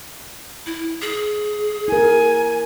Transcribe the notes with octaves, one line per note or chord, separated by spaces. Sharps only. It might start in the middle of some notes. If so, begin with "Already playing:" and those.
E4
G#4
E4 A#4 G#5